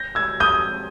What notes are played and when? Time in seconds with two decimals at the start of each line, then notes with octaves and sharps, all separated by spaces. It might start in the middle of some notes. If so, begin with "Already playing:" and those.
Already playing: G6 A#6
0.15 E6 G#6
0.40 D#6 G6